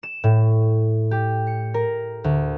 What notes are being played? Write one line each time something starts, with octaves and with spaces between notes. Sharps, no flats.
E7
A2
G4
C#7
A#4
D2